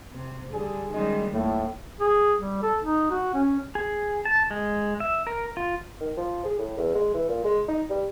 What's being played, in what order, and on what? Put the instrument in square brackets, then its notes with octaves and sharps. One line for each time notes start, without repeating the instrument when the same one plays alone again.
[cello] C3
[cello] D3 [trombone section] G3 G#4
[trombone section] F#2 G#3 [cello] D#3 G3
[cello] D#2 [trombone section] A2
[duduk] G#4
G3
A4
D#4
F#4
C#4
[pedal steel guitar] G#4
A5
G#3
E5
A#4
F4
[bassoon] D#3
F3
G#4
A2
E2
G#3
E3
A#2
G#3
D#4
G3